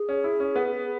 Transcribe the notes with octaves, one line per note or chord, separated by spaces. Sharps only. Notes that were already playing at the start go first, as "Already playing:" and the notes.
Already playing: G#4
C#4
E4
C#4
B3
G#4